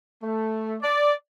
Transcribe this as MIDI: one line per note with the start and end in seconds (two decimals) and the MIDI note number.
0.23 0.76 57
0.82 1.13 74